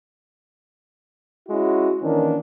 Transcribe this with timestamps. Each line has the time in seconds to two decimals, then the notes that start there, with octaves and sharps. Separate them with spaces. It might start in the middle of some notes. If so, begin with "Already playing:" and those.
1.48 G#3 C#4 E4 F#4
2.01 D#3 E3 A#3 C#4 D4